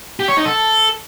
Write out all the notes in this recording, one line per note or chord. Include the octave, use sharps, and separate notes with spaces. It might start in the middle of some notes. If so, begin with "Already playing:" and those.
G4
C#5
D#4
A4